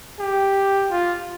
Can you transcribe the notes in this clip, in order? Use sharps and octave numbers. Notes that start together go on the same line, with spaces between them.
G4
F4